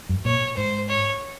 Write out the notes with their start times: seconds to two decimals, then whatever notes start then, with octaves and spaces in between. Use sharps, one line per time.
0.09 F#2
0.25 A#2 C#5
0.57 G#2 C5
0.88 C#5